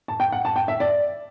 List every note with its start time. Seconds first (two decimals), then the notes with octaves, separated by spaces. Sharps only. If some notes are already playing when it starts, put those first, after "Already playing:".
0.08 A5
0.20 G5
0.32 F#5
0.45 A5
0.56 G5
0.68 E5
0.80 D5